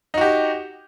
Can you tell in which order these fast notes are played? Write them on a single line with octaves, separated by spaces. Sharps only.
D#4 F#4 G4